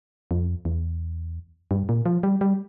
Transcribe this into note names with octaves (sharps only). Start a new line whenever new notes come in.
F2
E2
G2
A#2
F3
G3
G3